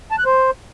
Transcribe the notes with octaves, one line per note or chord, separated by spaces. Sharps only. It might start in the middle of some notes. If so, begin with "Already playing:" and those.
A5
F#6
C5